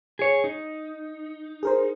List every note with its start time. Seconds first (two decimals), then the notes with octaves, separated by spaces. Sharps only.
0.19 G#4 C#5
0.44 D#4
1.63 G#4 A#4 C5